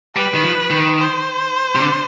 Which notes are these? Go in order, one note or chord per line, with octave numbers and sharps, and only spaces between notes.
G3 B4
D#3
F3
D#3
C5
C3
D3